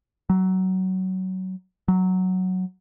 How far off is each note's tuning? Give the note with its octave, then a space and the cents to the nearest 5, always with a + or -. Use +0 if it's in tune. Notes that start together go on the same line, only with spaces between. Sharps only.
F#3 +20
F#3 +0